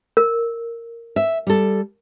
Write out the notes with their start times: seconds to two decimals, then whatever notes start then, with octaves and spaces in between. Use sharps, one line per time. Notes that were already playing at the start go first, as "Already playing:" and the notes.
0.17 A#4
1.16 E5
1.47 G3 A4